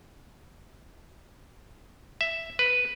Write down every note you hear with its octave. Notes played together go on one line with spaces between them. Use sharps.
E5
B4